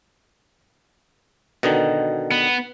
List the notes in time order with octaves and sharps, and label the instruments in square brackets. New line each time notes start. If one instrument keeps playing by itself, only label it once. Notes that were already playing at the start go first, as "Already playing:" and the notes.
[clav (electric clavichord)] B2 D3 D#3 [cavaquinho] D#5
[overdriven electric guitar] B3